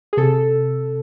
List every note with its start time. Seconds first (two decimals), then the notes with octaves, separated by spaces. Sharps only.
0.13 G#4
0.17 C3 A4